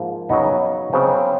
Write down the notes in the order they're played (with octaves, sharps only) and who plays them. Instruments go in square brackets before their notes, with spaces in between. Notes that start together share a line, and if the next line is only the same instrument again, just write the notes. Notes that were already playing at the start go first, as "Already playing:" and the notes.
Already playing: [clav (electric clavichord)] G#2 F3 A#3
[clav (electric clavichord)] C#3 F#3 B3 [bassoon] D#4
[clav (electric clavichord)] C#3 F#3 B3 [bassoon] C4